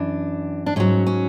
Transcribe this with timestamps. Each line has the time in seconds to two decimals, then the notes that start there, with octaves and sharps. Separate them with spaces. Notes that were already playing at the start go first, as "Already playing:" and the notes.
Already playing: F#2 E3 D4
0.66 D4
0.76 G#2 F#3 C#4
1.07 C#4